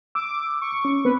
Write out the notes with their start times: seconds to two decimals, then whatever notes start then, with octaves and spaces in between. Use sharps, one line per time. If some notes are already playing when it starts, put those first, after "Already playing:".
0.15 D6 E6
0.61 C#6
0.85 C#4
1.05 B3 C4 B4